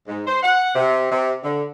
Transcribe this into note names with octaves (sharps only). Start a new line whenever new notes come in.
G#2
C5
F#5
C3
C3
D3